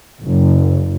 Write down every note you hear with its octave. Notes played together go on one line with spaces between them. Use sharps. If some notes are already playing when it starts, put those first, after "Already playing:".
F#1